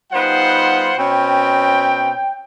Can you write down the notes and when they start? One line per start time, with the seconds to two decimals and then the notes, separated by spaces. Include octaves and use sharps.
0.13 G3 B3 D#4 F4 C5 F#5
0.98 B2 C4 C#4 G5